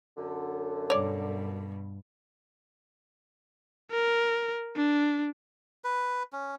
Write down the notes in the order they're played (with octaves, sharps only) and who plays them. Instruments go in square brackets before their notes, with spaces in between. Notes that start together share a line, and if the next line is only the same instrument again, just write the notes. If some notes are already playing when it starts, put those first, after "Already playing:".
[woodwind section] F#2 D3
[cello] G2 B2 [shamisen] C#5 D5
[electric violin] A#4
D4
[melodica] B4
C#4